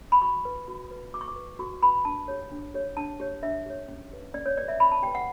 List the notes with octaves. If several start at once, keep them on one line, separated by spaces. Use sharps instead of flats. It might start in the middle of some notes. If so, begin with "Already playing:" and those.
B5
F#4 C#6
B4
F#4
B4
F#4 D6
C#6
D6
B4
F#4 C#6
B4 B5
D4 A5
G4 C#5
D4
G4 C#5
D4 A5
G4 C#5
D4 E5
G4 C#5
C#4
G4 B4
C#4 D5
C#5
G4 B4 D5
E5
C#4 B5
A5
G4 B4 G5
F#5